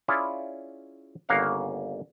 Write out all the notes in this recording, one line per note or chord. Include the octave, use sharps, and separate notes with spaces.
C#4 E4 F4 G#4 C#5 D5
G1 C#3 A#3 C#5 F5 F#5